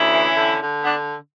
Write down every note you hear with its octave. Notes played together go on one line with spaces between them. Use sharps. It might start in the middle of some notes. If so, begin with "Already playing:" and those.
Already playing: D2 C#4 E4
E3
D3
D3
B3 D4